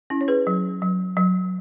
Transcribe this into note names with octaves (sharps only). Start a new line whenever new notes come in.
C#4 E4
C#5
G#4 B4
F#3
F#3
F#3